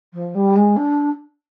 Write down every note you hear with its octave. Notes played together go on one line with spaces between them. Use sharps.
F3
G3
G#3
D4